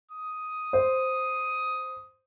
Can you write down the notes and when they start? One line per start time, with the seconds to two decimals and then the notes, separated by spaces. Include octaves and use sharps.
0.11 D#6
0.73 C5